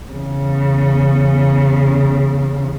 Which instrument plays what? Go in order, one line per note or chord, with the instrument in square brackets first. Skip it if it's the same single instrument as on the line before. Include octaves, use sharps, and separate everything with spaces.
[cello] E2 C#3